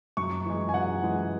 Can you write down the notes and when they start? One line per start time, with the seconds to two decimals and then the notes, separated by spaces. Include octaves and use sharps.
0.17 F#2 C#6
0.46 E3 G#3
0.69 G#5
0.74 F#2 F#5
1.03 E3 G#3